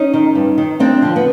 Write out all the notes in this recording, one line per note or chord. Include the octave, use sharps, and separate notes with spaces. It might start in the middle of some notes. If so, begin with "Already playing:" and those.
Already playing: C#4 D#4
D#3
G2
D#3
D2 C4 D4
D3 F3
B3